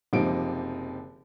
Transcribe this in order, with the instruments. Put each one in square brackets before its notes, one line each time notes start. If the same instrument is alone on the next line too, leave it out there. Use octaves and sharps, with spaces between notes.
[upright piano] F#1 C3 F3 D#4 G4 D7